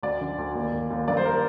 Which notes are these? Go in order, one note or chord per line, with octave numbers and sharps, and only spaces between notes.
D2 D5
D3
D2
D#2
D#2
D#2
G2 D5
C5
A#4